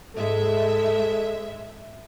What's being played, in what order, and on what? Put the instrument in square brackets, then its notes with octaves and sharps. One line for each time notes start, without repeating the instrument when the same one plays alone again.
[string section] G#2 G#3 E5 [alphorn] A4